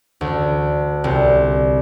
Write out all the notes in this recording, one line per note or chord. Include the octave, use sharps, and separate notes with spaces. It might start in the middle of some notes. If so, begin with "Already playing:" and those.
D2
C2